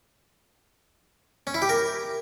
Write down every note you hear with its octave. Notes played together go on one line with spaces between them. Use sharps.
C#4
E4
G4
A#4